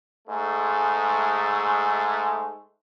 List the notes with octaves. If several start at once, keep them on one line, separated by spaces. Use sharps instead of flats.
G#2 G#3 A3